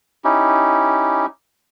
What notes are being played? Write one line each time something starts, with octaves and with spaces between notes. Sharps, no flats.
C#4 D#4 E4 G4